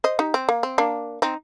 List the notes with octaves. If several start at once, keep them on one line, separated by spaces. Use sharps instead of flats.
C5 D#5
D#4 G4
C4
A#3
C4
A#3 D4
C4 D#4